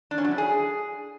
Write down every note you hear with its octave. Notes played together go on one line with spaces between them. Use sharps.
D4
C#4
F#3
E4
G#4